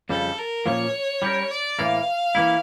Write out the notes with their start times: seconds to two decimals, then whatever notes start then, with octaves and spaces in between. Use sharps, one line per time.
0.09 F2 C#3 G3 A4
0.38 A#4
0.66 A#2 F3 A#3 C#4 C#5
1.22 G3 C#4 G4 A#4
1.51 D5
1.78 A2 E3 A#3 F5
2.35 E3 A#3 C#4 E4